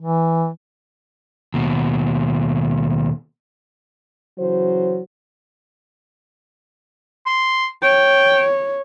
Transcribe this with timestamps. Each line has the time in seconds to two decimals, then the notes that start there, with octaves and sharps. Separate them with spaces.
0.01 E3
1.54 D#2 B2
4.39 C#3 E3 F#3 C5
7.26 C6
7.83 C#5 G5